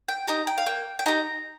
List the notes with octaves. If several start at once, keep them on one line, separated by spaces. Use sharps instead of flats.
G5
D#4 G4 A#5
G5
F5
A#3 G5
G5
D#4 G4 A#5